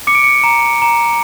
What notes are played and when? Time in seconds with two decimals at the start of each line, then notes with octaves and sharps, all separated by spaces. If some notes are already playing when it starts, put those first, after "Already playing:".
0.07 D6 C#7
0.15 D7
0.24 C#7
0.44 A#5
0.82 A#5